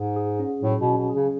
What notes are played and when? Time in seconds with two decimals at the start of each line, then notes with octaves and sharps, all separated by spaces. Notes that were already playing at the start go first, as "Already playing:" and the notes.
Already playing: G#2 G#4
0.16 G#4
0.40 C#4
0.63 A2 F#3
0.80 B2
0.86 C#4
0.97 B2
1.09 G#4
1.15 C#3